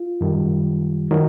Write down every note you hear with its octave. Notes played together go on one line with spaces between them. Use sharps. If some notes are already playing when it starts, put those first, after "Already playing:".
Already playing: F4
F#2 D#3 G3
D#3 F#3